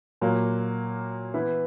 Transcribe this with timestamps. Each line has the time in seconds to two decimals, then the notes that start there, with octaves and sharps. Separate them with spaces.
0.21 A#2 F#3 A#3
1.34 E3 B3 E4 B4